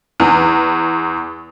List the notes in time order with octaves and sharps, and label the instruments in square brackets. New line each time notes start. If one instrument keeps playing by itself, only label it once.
[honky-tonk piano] E2